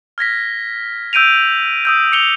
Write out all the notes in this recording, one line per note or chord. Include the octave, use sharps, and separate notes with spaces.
F6 G#6 A#6 B6
E6 G6 D7 D#7 F7
D#6 E6 G6
D6 C#7 F7 G7